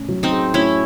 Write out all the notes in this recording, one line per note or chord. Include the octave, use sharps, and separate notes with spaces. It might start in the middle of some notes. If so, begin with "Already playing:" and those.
Already playing: A2 C#4
F#3
C4 D#4
G#4
A2 C#4 E4